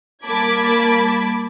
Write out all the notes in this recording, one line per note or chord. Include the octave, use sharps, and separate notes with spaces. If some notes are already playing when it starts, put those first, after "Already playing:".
G3 A#3 A5 B5 D6 G#6